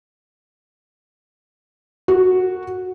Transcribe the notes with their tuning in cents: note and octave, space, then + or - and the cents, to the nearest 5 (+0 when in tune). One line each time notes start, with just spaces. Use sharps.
F#4 -5 A#4 -45